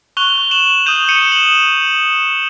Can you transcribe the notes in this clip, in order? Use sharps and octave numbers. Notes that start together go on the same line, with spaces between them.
C#6 F#6 F7 G7
E7 F#7
D#6 G6 D#7 F7
C#7 D#7
E7 F#7